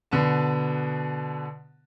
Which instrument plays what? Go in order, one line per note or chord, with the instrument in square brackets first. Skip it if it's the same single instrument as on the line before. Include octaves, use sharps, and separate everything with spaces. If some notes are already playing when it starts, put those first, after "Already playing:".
[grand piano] B2 D3 B3 A5